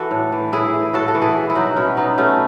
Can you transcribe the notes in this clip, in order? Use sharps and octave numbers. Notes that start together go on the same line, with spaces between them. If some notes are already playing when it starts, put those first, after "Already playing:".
Already playing: E3 F#4 A4
A2
E3
A2 E4 G#4
E3
A2 F#4 A4
F#4 A4
E3
E4 G#4
B2
E4
F#3 D#4 F#4
B2 C#4 E4
F#3 B3 D#4
B2 A3 C#4